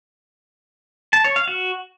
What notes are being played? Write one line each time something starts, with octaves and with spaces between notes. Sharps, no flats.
A5
C#5
F5
F#4